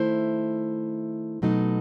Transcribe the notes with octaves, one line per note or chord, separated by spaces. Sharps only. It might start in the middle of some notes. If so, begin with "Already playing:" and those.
Already playing: D#3 A3 E4 C5
B2 F#3 A3 D#4